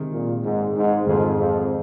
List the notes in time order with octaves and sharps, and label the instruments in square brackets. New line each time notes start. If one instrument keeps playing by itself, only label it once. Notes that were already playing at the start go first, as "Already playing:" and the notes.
Already playing: [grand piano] C3 D#3 G#3
[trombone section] A#2
G#2
G#2
[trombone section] F2 [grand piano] G#2 D#3 C4 G#4
[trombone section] F2